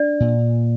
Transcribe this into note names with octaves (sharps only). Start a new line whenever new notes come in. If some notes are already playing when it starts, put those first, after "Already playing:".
Already playing: D4 D5
A#2